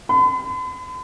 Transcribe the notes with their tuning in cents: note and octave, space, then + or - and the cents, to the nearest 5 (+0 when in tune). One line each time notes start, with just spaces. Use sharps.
B5 +45